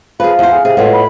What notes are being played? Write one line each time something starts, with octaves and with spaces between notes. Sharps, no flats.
F3 G#4 B4 F5
E2 C5
G#4
C3 G#4
A2 G#3 B3 F4
B5